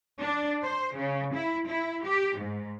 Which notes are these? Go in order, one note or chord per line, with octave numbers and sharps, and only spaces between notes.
D4
C5
C#3
E4
E4
G4
G#2